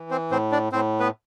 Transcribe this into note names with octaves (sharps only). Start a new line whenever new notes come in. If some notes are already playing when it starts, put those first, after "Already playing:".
Already playing: E3
C4 C5
A2 C4 C5
D4 D5
A2 C4 C5
B3 B4